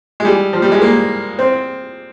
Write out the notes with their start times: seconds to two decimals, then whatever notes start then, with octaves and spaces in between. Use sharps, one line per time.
0.20 G#3
0.25 G3
0.53 F3
0.62 G3
0.72 G#3
0.82 A#3
1.39 C4